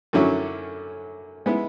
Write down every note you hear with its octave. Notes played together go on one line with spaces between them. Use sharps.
F#2 D3 F#3 C#4 E4
G#3 B3 E4